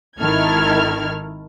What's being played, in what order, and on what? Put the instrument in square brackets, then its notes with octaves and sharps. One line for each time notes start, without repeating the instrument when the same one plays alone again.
[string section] G#1 D#3 E4 A4 F6 G#6